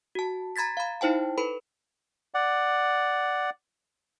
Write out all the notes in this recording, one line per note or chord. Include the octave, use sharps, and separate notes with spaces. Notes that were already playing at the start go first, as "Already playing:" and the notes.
F#4 A5
A#5 B5 G#6 A6 B6
F5 B5
D#4 E4 C5 G5 A5
A4 B4 B5
D5 F#5